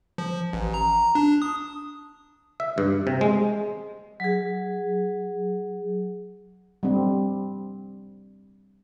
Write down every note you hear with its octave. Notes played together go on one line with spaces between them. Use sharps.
F3
A1
A#5
D4
D#6
E5
G2
C3
G#3
F#3 G#4
G3 C4